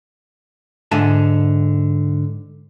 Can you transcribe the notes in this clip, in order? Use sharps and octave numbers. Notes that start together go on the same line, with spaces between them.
G#2 D3 E5 G#5 A5